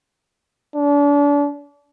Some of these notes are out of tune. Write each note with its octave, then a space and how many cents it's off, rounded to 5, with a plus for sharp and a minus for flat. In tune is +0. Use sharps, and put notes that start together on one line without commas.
D4 -35